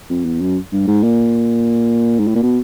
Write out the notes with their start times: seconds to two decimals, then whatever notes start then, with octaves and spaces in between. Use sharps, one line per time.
0.09 F2
0.25 E2
0.41 F#2
0.72 G2
0.87 G#2
1.03 A#2
2.19 G#2
2.27 A2
2.35 A#2
2.42 B2